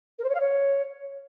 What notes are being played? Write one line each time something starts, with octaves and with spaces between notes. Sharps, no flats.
A#4
C5
C#5
F5
C#5